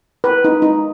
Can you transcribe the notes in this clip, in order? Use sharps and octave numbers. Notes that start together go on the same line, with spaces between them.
B4
D#4
D#4